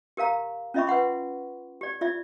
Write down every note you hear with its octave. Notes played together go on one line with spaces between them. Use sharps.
G4 A#4 F5 A#5
C#4 F4 D#5 E5 B5 C#6
B4 E5 F#5 C6
G4 D5
F4 D5 E5